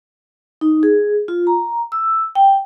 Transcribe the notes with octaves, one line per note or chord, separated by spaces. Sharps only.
D#4
G#4
F4
A#5
E6
G5